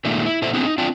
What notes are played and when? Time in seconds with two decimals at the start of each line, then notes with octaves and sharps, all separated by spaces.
0.05 A#2 D#3 G#3 A3
0.25 E4
0.42 A#2 A4 C5 E5
0.53 A3 B3 C4 D4 E4 G#4
0.65 D#4
0.78 C4 D4 F4 G5